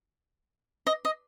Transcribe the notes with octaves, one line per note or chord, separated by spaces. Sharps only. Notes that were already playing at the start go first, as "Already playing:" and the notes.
D#5
D#5